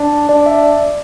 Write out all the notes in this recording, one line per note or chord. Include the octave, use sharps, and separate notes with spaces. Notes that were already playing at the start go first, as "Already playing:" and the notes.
Already playing: D4
D4 D5
E5
D5